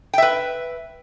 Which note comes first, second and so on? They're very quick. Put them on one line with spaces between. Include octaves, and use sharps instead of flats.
G5 E5 B4